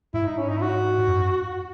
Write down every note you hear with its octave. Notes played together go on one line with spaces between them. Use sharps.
G#2 E4
D#4
C#4
D#4
E4
F#4
F#2